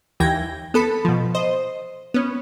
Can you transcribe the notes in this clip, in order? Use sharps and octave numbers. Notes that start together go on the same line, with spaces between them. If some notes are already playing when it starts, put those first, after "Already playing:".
D#2 E3 G5 G#6 A#6
B3 A4 B5
B2 F3
C5 D#5
B3 C#4